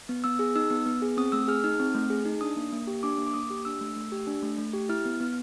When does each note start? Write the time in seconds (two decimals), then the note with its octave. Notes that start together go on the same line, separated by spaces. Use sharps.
0.09 B3
0.24 B3 E6
0.39 G#4
0.56 D#4 E6
0.71 B3
0.86 B3
1.02 G#4
1.17 C4 D#6
1.32 A3 E6
1.48 G#4 F6
1.64 D#4 F6
1.79 C4
1.95 A3
2.10 G#4
2.26 D#4
2.41 D4 D#6
2.56 A#3
2.73 A#3
2.87 G4
3.03 D4 D6
3.18 A#3
3.27 D6
3.34 A#3 D#6
3.50 G4
3.65 D4 E6
3.81 A3
3.96 A3
4.12 G4
4.27 D4
4.43 A3
4.58 A3
4.73 G4
4.89 E4 F6
5.05 B3
5.20 B3